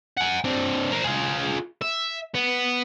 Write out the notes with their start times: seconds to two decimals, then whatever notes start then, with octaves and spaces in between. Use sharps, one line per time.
0.17 F#5 G#5
0.44 C4 D4
0.92 A#4 C5
1.04 F4 G#4
1.82 E5
2.34 B3